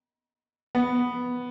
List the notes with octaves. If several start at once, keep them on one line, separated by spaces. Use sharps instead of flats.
B3